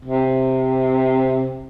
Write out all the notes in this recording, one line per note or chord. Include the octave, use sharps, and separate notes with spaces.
C3